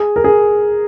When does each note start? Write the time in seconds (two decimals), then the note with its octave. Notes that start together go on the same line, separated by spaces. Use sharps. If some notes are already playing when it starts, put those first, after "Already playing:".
Already playing: G#4
0.16 A#4
0.24 G#4